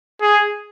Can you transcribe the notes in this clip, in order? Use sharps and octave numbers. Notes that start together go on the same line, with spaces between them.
G#4